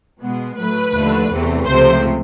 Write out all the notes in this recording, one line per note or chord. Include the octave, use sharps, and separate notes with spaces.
B2 G#3 B3
A2 F#3 A3 B4
D#2 D3 F3 A3
E2 C3 E3 A3
C#2 C3 F3 A3 C5